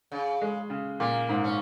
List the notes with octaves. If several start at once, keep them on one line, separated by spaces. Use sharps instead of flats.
C#3
G#3
C#3
A#2 A#3
G#2
C#4